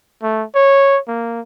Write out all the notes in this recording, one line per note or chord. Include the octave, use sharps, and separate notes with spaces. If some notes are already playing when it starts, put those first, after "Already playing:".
A3
C#5
A#3